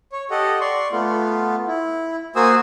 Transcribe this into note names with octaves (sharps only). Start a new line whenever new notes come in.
C#5
G4 A4 D#5 F#5
D5 C6 C#6
A3 B3 F4
E4
A#3 F#4 C5 G#5 D#6 E6